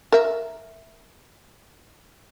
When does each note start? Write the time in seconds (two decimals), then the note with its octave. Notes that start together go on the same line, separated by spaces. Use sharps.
0.12 A#4 E5